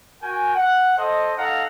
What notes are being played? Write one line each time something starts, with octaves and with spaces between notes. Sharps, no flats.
F#4 A#4 G5 G#5
F#5
A4 C5 D#5
D#4 A4 F5 F#5 A#5